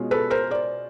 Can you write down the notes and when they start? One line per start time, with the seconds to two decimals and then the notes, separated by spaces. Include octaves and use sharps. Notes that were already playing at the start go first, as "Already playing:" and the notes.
Already playing: B2 G#3 C#4 F4
0.11 A4 B4
0.30 A#4 C5
0.51 C5 D5